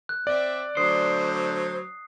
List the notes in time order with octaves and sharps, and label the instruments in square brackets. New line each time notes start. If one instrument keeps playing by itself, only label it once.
[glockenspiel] F#6
[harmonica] C4 E5 [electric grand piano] D5
[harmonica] D3 F#3 A3 [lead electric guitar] C5 [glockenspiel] D#6 C7